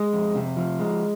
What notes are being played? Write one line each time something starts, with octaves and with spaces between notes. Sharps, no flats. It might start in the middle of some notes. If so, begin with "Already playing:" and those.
Already playing: G#3
F2
C3
F3
G#3